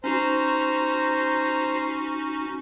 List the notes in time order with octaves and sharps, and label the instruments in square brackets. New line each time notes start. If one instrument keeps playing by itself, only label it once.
[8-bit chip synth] C#4 D#4 F#4 [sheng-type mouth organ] C5 A#5